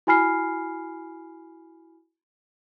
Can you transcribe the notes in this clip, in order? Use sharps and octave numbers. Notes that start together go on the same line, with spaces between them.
E4 F#4 G#5 B5 F6 C7